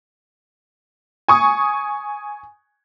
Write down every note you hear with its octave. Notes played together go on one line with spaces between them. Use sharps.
G#5 C#6 D#6